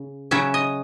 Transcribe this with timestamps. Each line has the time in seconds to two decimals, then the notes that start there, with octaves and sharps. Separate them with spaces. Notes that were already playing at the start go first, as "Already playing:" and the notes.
Already playing: C#3
0.31 C#3 F#3 C#4 E5
0.54 D#5